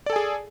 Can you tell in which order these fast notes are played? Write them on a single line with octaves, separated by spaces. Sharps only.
D5 A4 G#5 G#4